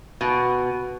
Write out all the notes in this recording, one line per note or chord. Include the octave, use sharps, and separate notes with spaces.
B2